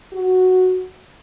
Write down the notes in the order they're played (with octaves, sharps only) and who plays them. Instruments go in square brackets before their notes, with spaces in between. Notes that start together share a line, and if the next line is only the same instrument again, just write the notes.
[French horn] F#4